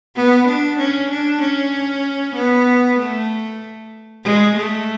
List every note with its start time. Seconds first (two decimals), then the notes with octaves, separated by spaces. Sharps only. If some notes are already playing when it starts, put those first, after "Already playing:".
0.15 B3
0.47 D4
0.78 C#4
1.10 D4
1.41 C#4
2.35 B3
2.98 A3
4.24 G#3
4.55 A3